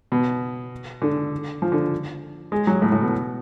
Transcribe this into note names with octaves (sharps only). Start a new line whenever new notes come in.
B2
D3
F3
D3
G#3
F#3
A2
A2
B2